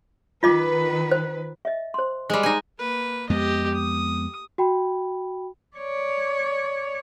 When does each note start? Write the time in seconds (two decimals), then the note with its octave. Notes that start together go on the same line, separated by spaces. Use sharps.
0.43 D#3 F4 B4 D#5 D6
1.11 C5
1.65 D#5 E5
1.94 C5 C6
2.30 G3 G#3
2.43 D#4 G#5
2.79 A#3 B4
3.30 F2 G#3 B3 G4 D#5
3.74 D#6
4.58 F#4 G5 B5
5.77 C#5 D5